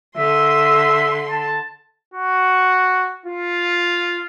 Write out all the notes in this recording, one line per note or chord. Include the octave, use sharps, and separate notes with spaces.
D3 E5 C6
A5
F#4
F4